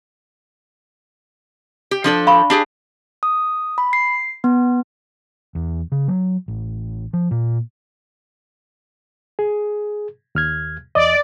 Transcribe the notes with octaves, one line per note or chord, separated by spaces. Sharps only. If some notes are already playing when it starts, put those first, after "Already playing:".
G4
F3 D4 A4
F5 B5 C#6
D4 G4 G#4
D#6
B5
C7
B3
E2
C#3
F#3
A1
F3
A#2
G#4
D#2 F6 G#6
E2 D5 D#5